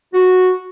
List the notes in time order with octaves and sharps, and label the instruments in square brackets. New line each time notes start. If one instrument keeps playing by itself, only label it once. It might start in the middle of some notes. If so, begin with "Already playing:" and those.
[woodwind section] F#4